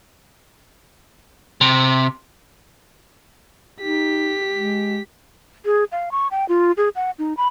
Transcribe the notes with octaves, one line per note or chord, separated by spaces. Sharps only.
C3
D#4 G4 B6
G#3
G#4
F5
C#6
G5
F4
G#4
F#5
D#4
B5